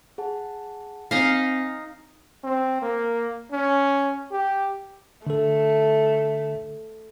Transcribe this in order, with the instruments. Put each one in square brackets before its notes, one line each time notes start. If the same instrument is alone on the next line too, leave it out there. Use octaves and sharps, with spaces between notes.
[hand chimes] G#4 F#5 A5
[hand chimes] C4 G#5 B6 [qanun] D#4 D#5 F5
[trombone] C4
A#3
C#4
G4
[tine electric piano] D3 A4 [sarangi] A3